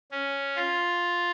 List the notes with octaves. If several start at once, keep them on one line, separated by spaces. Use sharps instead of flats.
C#4
F4